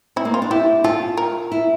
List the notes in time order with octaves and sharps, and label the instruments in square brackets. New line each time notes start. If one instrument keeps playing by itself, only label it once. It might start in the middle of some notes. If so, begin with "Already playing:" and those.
[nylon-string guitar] C4 [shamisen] E4
[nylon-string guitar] A#3
[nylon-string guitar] C4 [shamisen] F4
[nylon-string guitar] D4
[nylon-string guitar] E4 [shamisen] G4
[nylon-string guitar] F4 [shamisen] A4
[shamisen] A#4
[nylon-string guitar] E4